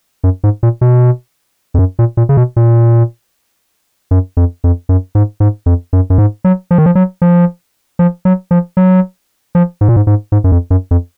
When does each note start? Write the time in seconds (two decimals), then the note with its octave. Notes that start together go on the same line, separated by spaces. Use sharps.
0.24 F#2
0.44 G#2
0.63 A#2
0.81 B2
1.74 F2
1.79 F#2
1.99 A#2
2.17 A#2
2.29 C#3
2.37 B2
2.56 A#2
4.11 F#2
4.37 F2
4.64 F2
4.89 F#2
5.15 G#2
5.40 G#2
5.66 F2
5.93 F#2
6.10 F#2
6.18 G#2
6.44 F#3
6.71 F3
6.78 D#3
6.86 F3
6.95 F#3
7.22 F3
7.99 F3
8.25 F#3
8.51 F3
8.77 F#3
9.55 F3
9.81 G#2
9.88 A#2
9.96 G#2
10.07 G#2
10.32 G#2
10.44 F#2
10.52 F2
10.70 F#2
10.91 F2